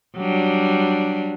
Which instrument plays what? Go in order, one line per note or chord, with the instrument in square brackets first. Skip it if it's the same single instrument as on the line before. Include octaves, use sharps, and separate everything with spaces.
[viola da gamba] F#3 G3 D4